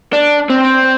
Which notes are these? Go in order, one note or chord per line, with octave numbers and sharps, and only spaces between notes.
D4
C4